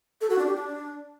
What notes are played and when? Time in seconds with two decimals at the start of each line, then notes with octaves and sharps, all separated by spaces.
0.21 A4
0.30 F#4
0.38 D4
0.47 G4
0.56 D4